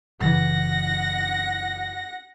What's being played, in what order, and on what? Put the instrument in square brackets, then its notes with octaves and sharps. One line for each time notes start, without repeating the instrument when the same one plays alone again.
[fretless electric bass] F#1 C#3 E3 [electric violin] F#5 A#6